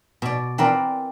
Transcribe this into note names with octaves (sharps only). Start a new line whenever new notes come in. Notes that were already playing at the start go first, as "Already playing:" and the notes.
B2 D5
E3 C4 E4 A#4 D5